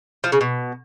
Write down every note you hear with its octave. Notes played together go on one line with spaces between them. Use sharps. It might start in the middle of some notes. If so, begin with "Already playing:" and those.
F3
C#3
B2